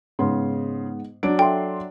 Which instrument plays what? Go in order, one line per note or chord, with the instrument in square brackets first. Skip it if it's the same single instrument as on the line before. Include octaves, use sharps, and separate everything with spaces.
[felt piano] G#2 B3 [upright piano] C#3 C6
[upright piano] F#3 D4 [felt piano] D7
[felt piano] A4 E5 C6 [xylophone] G5